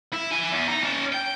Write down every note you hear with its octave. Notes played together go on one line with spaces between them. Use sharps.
E4
E4 G#5
E2
D#4 A#5
C#4 A5
G5